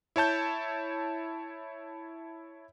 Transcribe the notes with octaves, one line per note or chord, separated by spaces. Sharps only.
E4 C#5 A5 G6